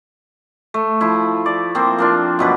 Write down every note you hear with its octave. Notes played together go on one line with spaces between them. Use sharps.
A3
F3 E4
D5
F3 A#3 C4
A#3 D4 F4
F#2 B2 B4